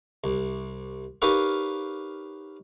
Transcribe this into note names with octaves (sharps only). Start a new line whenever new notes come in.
C2
D#4 G4 A#4 B4 C#5 F5